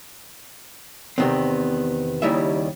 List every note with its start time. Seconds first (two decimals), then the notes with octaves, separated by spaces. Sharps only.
1.18 E2 A2 C3 D#3 B3 C4
2.22 D#2 C#3 G3 D#4 E4 E5